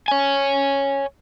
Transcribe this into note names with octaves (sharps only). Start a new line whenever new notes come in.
C#5 G#5